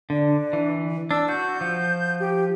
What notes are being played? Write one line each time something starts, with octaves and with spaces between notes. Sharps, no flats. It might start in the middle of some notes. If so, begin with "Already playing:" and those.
D3 D4
E3
D4 E6
F#4 G6
F3
G4